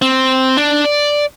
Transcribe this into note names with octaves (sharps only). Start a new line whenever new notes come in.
C4
D4
D5